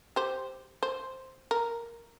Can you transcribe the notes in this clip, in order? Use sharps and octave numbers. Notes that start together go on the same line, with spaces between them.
G4 C5
C5
A#4